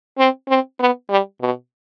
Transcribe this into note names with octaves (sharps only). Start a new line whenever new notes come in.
C4
C4
B3
G3
B2